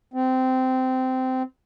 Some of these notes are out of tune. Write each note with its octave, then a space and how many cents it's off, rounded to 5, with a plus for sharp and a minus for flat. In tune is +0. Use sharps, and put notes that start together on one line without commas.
C4 -15